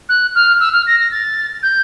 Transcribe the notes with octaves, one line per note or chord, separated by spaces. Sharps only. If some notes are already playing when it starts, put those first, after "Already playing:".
F#6
F6
E6
F6
A#6
A#6
A6
G6